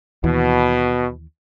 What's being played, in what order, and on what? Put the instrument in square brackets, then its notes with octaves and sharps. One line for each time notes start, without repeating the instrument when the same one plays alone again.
[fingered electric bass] D#2 E3 [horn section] B2